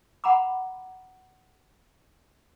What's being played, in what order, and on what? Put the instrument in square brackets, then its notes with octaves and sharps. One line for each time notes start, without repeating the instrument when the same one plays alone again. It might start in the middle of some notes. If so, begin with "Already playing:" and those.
[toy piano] F#5 A#5 B5 D6